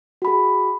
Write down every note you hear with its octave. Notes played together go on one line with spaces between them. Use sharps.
F#4 G#4 B5